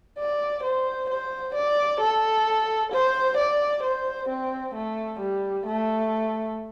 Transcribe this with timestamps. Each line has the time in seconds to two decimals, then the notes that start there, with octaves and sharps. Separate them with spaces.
0.19 D5
0.64 C5
1.09 C5
1.55 D5
2.01 A4
2.92 C5
3.37 D5
3.83 C5
4.29 C4
4.75 A3
5.20 G3
5.66 A3